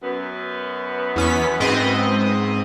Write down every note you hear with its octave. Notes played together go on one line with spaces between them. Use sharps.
F#2 B3
E2 C#4 B6
G#2 C4 D#5